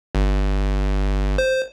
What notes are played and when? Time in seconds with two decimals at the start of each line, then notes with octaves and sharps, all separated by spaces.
0.15 G1
1.38 C5